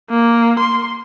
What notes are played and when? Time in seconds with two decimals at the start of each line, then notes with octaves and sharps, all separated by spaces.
0.10 A#3
0.60 C6